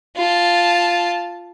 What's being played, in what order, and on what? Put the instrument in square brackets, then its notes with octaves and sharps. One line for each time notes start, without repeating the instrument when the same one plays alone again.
[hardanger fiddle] F4 A5